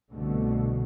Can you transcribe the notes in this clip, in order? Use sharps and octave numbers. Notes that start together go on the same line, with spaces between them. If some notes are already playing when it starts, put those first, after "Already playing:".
C2 B2 D3 A3